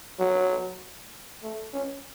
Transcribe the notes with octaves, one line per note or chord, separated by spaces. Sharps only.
F#3
A3
C#4